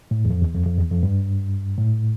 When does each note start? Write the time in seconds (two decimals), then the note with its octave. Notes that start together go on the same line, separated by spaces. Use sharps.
0.11 A2
0.25 E2
0.30 F2
0.42 E2
0.55 F2
0.66 F2
0.79 E2
0.91 F2
1.03 G2
1.78 A2